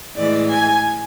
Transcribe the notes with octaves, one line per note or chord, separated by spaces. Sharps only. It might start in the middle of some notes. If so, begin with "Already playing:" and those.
A2 E3 G#3 D5
G#5